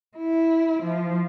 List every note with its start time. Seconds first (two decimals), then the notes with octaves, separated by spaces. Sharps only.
0.17 E4
0.83 F3